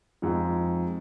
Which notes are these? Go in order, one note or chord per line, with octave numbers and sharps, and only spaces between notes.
F2 F3 G#3 D#4